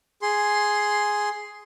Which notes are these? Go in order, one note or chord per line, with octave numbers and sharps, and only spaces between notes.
G#4 C6